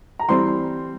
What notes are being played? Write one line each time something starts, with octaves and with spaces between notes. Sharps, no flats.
A#5
E3 G3 C4 C6